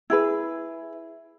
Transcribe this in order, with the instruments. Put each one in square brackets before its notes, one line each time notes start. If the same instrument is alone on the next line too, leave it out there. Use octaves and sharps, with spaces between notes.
[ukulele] E4 G#4 B4